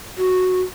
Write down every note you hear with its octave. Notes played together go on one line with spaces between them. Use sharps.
F#4